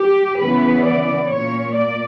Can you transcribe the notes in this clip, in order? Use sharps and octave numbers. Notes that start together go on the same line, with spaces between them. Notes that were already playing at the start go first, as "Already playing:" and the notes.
Already playing: G4
C#3 E3 B3 B4
D5
A#2 A#3 C#5
D5